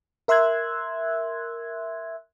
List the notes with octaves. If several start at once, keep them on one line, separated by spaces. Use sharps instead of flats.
A#4 E5 C6 E6 F#6 G#6